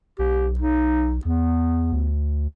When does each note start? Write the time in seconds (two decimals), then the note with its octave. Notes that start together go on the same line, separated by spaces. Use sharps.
0.19 B1 G4
0.59 D#4
1.25 E2 B3
1.92 D2